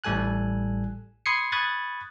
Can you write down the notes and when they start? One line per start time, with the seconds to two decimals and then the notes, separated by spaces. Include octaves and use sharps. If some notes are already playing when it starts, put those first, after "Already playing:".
0.04 A1 A2 G3 A4 G#5 F#6
1.26 B5 C6 D#6 G#6 C7 C#7
1.52 B5 C#6 D#6 F#6 G#6 A6